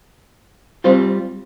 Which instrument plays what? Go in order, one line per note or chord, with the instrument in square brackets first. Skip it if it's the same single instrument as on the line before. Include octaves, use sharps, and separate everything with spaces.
[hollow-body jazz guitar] G3 C4 F4 C5